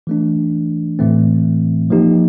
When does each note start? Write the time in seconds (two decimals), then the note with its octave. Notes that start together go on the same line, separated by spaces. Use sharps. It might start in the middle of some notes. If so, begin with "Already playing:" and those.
0.07 E3 A3 D4
0.99 A2 E3 A3 C4
1.90 F3 A#3 D#4 G4